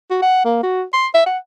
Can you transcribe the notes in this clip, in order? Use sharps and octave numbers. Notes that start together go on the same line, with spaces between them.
F#4
F#5
A#3
F#4
C6
E5
F#5